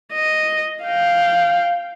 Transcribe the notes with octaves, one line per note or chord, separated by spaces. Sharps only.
D#5
F5 G5